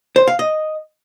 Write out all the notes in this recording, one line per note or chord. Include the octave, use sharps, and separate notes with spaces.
C5
F5
D#5